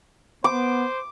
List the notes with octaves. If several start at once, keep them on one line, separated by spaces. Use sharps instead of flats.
B3 C5 D6